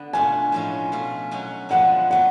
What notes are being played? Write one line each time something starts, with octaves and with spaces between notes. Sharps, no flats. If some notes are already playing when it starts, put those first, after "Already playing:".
Already playing: D3 B3
B2 A3 D4 F4 G#5
A2 F3 G#3 C#4
B2 A3 F4
B2 F#3 C#4
D3 F3 G#3 B3 D4 F#5
F#3 A3 F#5